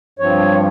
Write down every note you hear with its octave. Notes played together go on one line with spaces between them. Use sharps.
G2 F3 C4 C#5